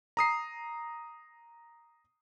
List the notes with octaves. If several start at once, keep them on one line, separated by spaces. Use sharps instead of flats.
A#5 D#6 C7